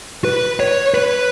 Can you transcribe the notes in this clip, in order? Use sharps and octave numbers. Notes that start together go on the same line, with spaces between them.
B4
C#5
B4